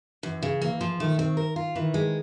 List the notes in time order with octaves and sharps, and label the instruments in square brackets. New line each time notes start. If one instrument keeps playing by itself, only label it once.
[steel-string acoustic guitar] F#2 [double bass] E3
[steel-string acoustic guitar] C#3
[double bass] E3 [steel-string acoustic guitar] A#3
[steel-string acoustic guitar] F3
[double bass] D#3 [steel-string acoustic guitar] A3
[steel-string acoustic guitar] C4
A#4
F4
[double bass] D#3 [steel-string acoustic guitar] E3
[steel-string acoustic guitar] G#3